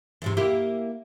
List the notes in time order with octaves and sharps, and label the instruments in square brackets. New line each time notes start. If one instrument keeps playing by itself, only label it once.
[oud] E2 G#2 C3
A#3 E4 G4